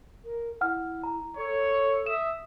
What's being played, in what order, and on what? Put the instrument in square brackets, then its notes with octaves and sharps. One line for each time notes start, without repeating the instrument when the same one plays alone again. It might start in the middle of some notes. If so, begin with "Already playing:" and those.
[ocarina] A#4
[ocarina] E4 [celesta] F#5 F6
[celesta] A#5
[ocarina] A4 [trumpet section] C#5
[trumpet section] E5 D#6 [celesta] E7